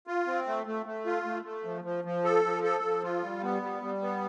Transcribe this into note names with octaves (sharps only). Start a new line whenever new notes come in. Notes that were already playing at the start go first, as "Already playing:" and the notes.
F4
C4
A3
A3
A3
F4
A3
A3
F3
F3
F3
A4
F3
A4
F3
F4
G3
B3
G3
G3
B3